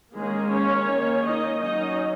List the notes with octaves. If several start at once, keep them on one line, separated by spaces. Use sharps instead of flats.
D#3 G#3 A#3 C#4 G#4
C#4 C#5
D#3 A#3 C#4
D#4 D#5
F#3 C#4 D#4 D#5